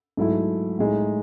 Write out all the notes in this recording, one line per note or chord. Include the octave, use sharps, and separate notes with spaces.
G#2 F#3 A3 E4
A2 G#3 D#4